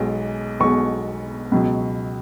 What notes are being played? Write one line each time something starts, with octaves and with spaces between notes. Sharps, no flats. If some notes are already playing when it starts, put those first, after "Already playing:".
Already playing: B1 B2 G#3
B1 B2 G#3 C#6
C#2 B2 F#3